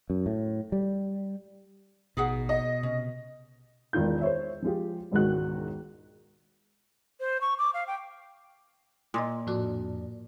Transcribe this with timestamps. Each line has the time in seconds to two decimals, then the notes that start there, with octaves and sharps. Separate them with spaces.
0.10 F#2
0.26 A2
0.72 G3
2.17 A1 B2 D#4 G#4 F#5
2.49 D#5
2.83 C3 C#4
3.93 E1 E2 D#3 F4 G6
4.21 C5 C#5 E5
4.62 F3 G#3 F4 G4
5.12 E1 C#2 G#2 D#3 F#4 F#6
7.20 C5
7.41 C#6
7.58 D6
7.74 F5
7.87 G5
9.14 A#2 D#5 C6 D#6
9.47 F2 A2 D4 F#4 D6